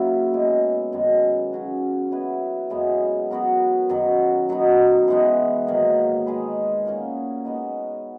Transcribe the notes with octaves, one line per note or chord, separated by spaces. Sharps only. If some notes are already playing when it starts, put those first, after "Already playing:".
Already playing: F#2 C#3 F#3 A#3 C#4 E4
B2 G#3 C#4
F#2 D#3 G#3 B3
C#3 F#3 C#4 F#4
F#3 B3 E4 B4
F#2 C#3 G#3 B3
F#3 B3 F#4 A#4
F#2 D#3 F#3
B2 F#3 B3 D#4
E3 G#3 B3
G#2 D#3 F#3 A#3
G#3 D#4 G#4 B4
A#2 A#3 C#4 F#4
G#3 B3 D#4